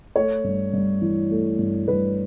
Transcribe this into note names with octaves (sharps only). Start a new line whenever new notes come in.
A3 C#5
G2
G2
E3
A3
G2
G2 B4